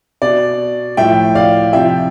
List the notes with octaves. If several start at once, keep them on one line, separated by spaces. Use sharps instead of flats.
B2 D5
A2 F3 E5 G5
D5 F5
C3 F3 E5 G5